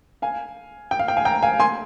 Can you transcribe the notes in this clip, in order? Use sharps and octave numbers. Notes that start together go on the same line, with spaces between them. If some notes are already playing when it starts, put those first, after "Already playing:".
F5 G#5
G5
F5
G5
F5 G#5
G5 A#5
F5 G#5
G#5 C6